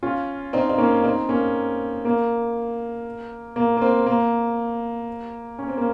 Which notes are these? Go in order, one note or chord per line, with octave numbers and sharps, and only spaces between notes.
C#4 F4
C4 D#4
D#4
A#3 C#4
C4 D#4
A#3 C#4
A#3
A#3
A#3
C4
A#3
C#4
C4
A#3